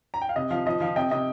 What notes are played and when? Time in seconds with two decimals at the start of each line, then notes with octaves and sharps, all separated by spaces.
0.14 A#5
0.22 G5
0.29 F5
0.36 C3 D#5
0.50 F3 F5
0.66 F3 D#5
0.81 F3 F5
0.96 C3 D#5 G5
1.11 C3 D#5